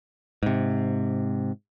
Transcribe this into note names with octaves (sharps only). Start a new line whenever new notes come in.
G#2 C3